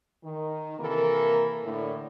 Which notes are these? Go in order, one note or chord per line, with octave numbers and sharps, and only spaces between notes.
D#3
C3 E3 A#3 A4 A#4
A2 D3